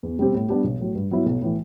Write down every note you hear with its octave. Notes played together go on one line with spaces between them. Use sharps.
E2
B2 G3 C4 G4
A2
G3 B3 D4 G4
B1
A2 F#3
G2
F#3 B3 E4
B1
A2 E3